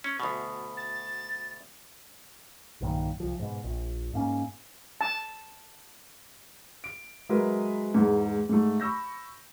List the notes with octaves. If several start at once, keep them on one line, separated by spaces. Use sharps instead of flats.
C#4
D2 B2
A6
B1 G2 A#2 D#3
C2 F3
G#2 B2
A#1
G#2 A#3 C#4
A5
D7
F#3 G#3 G#4 A#4 B4 E5
E2 G#2
G#2 A3
B5 C#6 E6 G6 A#6